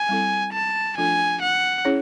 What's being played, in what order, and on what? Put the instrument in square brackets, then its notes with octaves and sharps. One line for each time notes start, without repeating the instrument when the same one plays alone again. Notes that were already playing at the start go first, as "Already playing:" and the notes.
Already playing: [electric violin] G#5
[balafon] G3 C4 E4 A4
[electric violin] A5
[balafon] F3 A3 D4 F4 A4 [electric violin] G#5
[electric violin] F#5
[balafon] C#4 E4 G#4 C#5